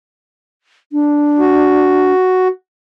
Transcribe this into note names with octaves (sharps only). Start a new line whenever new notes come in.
D4
F#4